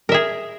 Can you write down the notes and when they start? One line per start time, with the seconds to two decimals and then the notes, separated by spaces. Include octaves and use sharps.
0.09 A#4
0.12 E5
0.14 G#4